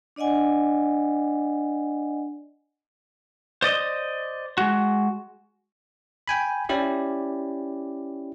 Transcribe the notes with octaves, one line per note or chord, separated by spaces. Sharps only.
D4 D5 D#5 F#5 G#5
C5 D5 D#5
G#3 F#4
G5 G#5 B5
C#4 E4 G4 D5